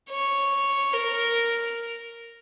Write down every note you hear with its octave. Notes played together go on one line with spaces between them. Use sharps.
C#5
A#4